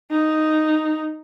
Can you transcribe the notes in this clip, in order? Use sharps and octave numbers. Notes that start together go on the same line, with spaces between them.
D#4